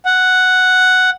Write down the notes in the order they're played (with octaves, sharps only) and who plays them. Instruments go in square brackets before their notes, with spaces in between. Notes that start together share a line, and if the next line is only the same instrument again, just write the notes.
[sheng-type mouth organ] F#5